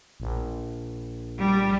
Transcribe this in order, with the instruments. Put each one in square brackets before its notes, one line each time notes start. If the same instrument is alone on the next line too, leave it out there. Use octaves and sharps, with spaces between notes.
[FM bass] A#1
[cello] G3